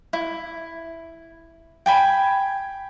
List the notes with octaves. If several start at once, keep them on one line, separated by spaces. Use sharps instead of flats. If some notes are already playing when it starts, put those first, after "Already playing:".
E4
G5 G#5 B5